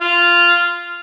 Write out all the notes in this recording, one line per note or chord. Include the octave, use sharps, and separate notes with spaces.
F4